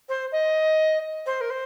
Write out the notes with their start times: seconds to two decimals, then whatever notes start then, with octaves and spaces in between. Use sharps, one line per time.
0.09 C5
0.32 D#5
1.26 C5
1.41 A#4
1.50 C5